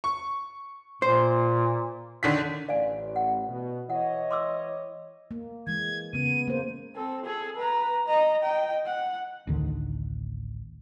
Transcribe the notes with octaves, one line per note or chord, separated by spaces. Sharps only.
C#6
A#2 C5
D3 D#3 B6
A1 D5 F5 G#5
F#5
B2
E3 C#5 D#5 F#5
C6 D6 E6
A#3
E3 G#3 G#6
C#3 B3 D#7
A#3 C5
C4 A4
G#4 A4
B4 A#5
D#5 A#5
D#5 G5
F#5
A1 D2 D3 D#3